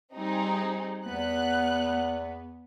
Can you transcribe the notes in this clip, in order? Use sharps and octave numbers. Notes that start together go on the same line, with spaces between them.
G3 C4 D#4 G#4
E2 B3 F#6